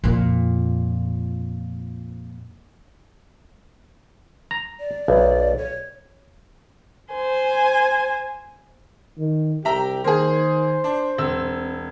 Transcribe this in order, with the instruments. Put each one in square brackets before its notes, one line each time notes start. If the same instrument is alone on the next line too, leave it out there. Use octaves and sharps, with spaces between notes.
[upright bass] F2 A#2
[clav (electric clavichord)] A#5
[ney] D5
[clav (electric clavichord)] B1
[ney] C#5
[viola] C5 G#5
[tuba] D#3
[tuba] C2 [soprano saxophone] G4 [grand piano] E5 A#5
[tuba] D#3 [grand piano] A#3 G#4 [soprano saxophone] C5
[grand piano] D4
[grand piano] E1 E6 [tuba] C4